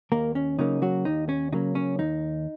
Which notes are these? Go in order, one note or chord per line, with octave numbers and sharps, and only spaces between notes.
D#2 A#3 A#4
C#4
C#3 F#3 A#3 C#4 D#4
F#3 F#4
D#2 D#4
C#4
C#3 F#3 A#3 C#4 D#4
C#4
D#2 D#4